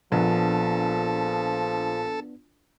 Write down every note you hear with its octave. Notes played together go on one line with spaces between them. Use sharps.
A#1 F3 B3 D4 A4